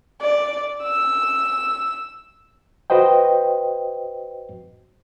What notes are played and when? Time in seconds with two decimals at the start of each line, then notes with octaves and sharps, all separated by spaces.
0.21 D5
0.83 E6
2.90 F#4 B4 C5 D#5 G5